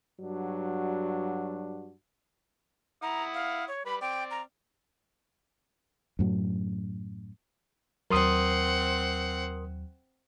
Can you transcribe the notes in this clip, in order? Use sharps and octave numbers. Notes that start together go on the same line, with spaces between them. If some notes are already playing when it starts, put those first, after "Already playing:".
G2 F#3 D4 F#4
E4 F#5 A#5 D#6
F5
C#5
G3 B4 B5
C4 D5 G5
A#5
F#2 A2 F#3
D#2 F#3 C4 A#4 F#5 C6 D#6